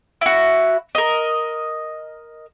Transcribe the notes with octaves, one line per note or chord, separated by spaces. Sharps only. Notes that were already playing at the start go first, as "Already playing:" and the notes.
E4 F#4
A#4 D#5